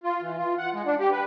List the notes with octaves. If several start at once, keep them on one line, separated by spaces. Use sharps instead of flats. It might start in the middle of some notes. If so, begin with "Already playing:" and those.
F4
E3
F4
F#5
G#3
D4
G4
B4